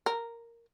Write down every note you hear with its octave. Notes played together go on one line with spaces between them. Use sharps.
A#4